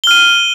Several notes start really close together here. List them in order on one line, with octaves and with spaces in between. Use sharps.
G7 F6 D#7